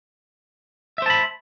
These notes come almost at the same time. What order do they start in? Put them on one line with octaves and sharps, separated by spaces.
E5 C5 A5 B5